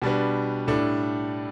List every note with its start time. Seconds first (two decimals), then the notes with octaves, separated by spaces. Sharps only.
0.02 B2 G3 D4 B4
0.67 A2 G3 D4 A4